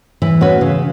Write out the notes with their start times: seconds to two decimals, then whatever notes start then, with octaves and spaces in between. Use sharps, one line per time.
0.22 E3
0.41 C#4 F#4 B4
0.61 C#3